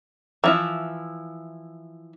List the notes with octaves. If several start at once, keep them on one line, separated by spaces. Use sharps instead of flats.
E3 F3 E4